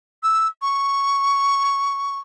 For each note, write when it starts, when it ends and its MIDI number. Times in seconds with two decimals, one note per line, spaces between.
0.23 0.47 88
0.62 2.19 85